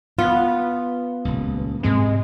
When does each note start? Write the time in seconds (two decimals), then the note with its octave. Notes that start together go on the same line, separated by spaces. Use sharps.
0.19 B3 F4
1.25 D#1 C#2
1.83 G#2 C3 G#3 C4